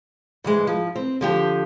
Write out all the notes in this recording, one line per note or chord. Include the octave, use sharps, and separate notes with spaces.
G#2 E3 G#3
F3
C4
D3 F3 G4